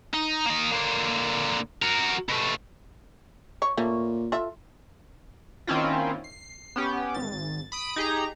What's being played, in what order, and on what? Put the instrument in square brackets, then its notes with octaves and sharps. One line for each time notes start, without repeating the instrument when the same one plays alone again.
[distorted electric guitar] D#4
A#3 D#5
D3 A#3
F#4 A#4
B2 A3
[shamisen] C#5
[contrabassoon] A#2 [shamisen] A3 A#3 C#4
[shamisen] F4 A4 E5
[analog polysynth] D#3 A#3 C4 C#4 E4 F4
C7
B3 C#4 G4
G#1 A6
B5 D#6 D7
D#4 G4 G#4 A#5